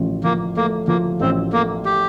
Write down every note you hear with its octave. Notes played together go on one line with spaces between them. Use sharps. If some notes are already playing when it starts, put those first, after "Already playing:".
Already playing: A1 F3
F3 A#3
A3 A#3
F3 A#3
A1 C4
A3 A#3
G4